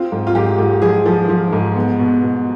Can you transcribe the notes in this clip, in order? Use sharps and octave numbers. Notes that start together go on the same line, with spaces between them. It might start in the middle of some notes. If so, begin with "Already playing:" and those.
Already playing: C4 F4
G#2
F4
G#2 G4
G#2
F3 G#4
F3
F3
G#2
B3
B2
B2